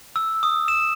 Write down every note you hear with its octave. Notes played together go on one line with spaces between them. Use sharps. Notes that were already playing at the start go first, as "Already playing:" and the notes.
E6
D#6
E7